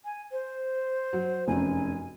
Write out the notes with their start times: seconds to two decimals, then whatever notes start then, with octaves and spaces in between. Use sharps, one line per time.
0.05 G#5
0.32 C5
1.13 F#3
1.48 F1 F#2 G#5